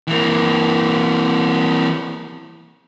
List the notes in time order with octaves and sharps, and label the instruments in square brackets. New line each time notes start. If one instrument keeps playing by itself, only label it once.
[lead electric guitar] E3 A#3